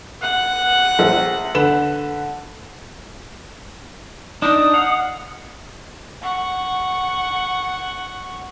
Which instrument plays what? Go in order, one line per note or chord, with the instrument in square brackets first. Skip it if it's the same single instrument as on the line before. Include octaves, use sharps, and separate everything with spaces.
[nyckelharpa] F#5
[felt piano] A#1
D3 B4 E7
[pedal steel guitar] D4 D#4 [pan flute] D#6
[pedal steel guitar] F5 F#5
[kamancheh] F#5 C#6